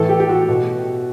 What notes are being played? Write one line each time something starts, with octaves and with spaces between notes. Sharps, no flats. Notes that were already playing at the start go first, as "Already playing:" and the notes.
Already playing: A2 E3 A4
G4
G4
F#4
B2